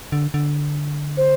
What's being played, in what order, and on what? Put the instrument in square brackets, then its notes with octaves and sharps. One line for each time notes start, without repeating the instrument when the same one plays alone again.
[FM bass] D3
D3
[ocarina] C5